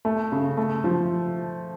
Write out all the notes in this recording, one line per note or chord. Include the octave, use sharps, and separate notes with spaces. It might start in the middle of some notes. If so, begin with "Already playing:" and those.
A3
C#3
A3
F3